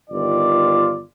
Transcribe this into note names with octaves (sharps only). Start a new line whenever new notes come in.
G1 D#3 F4 D5